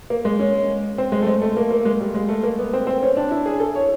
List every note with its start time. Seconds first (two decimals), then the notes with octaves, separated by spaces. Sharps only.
0.10 A#3
0.25 G#3
0.39 C#4
0.98 C4
1.12 G#3
1.22 A3
1.27 G#3
1.41 A3
1.57 A#3
1.70 A#3
1.85 G#3
2.00 G3
2.14 G#3
2.29 A3
2.43 A#3
2.59 B3
2.73 C4
2.87 C4
3.03 C#4
3.17 D4
3.31 E4
3.46 G#4
3.60 A4
3.75 C#5